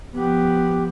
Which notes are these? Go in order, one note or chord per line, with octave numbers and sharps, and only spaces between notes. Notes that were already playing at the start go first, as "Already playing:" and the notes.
F3 B3 G4